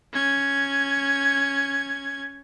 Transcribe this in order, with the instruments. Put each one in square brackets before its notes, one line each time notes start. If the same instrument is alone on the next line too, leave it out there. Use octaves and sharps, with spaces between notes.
[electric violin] C#4 G#6